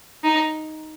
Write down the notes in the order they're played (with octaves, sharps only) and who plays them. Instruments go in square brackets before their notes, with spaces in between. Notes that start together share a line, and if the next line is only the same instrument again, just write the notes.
[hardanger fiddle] D#4